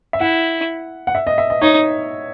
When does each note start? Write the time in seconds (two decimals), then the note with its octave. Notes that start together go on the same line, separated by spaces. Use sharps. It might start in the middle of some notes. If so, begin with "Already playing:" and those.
0.13 E5
0.20 E4 F#5
1.07 F#5
1.15 E5
1.27 D#5
1.38 E5
1.50 D#5
1.62 D#4 C#5